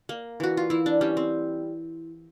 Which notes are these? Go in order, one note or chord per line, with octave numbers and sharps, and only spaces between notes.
A#3
E3 F#4
F4
E3 E4
D4
G3 C#4
C4